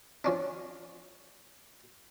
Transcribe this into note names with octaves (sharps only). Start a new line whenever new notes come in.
F3 C#4 D4